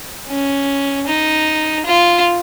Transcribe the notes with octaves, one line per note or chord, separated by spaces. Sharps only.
C#4
D#4
F4